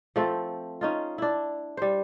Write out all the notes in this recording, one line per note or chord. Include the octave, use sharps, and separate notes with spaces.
F3 A3 C4
C#4 D#4 F4
D4 E4
G3 C5